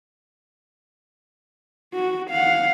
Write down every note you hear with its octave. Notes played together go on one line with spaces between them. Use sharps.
F#4
F5 F#5